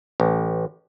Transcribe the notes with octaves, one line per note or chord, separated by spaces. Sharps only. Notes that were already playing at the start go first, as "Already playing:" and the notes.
A1